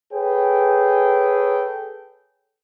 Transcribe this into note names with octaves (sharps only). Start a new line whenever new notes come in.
G#4 A4 B4 C#5 G5